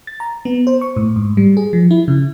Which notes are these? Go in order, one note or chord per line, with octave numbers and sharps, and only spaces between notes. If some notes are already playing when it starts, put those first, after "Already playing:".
A6
A#5
B3
C5
C#6
A2
G#2
G3
G#4
F3
E4
C#3